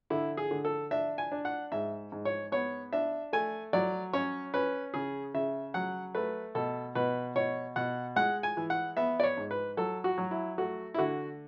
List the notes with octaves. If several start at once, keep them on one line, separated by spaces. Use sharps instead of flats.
D3 E4
G#4
D3
A4
D4 E5
G#5
D4
F#5
G#2 E5
G#2
C#5
B3 C#5
D4 E5
A3 G#5
F#3 D5
C#4 C#5
C#4 B4
C#3 G#4
C#3 E5
F#3 F#5
A3 B4
B2 A4
B2 B4
B2 C#5
B2 F#5
G#3 F#5
G#5
E3
F#5
B3 E5
D5
C#5
G#2
B4
F#3 A4
F#4
F#3
E4
A3 F#4
E4
D3 F#4